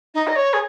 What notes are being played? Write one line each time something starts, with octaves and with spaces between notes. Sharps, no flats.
D#4
D#5
C#5
G#4